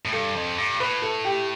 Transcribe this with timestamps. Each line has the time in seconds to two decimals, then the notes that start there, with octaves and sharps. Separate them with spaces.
0.05 A2
0.13 G2 A4
0.35 F2
0.58 G2
0.80 A2 B4
1.02 A4
1.25 G4